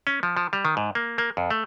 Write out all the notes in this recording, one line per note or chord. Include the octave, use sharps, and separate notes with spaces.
C#4
F3
F3
G3
D#3
G#2
A#3
A#3
F2
A3